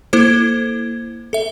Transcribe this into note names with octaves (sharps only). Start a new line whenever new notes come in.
A#3 E4 A4 C5
A4 E5